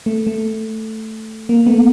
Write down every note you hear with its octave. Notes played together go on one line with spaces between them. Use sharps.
A3
A3
A#3
A3 B3